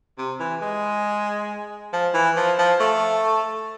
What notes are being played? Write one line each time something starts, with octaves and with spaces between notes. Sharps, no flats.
C3
E3
G#3
F3
E3
F3
F3
A3